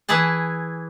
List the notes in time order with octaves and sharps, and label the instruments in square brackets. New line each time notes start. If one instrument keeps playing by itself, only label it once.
[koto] E3 E4 G#4 A5